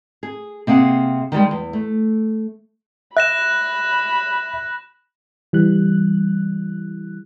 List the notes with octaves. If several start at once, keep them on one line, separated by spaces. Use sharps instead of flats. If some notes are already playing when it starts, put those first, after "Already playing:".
G#4
C3 A#3 G#4 F#5
D#3 E3 G3 G#3
E2
A3
E5 B5 F#6 A#6 E7
E3 G3 F#6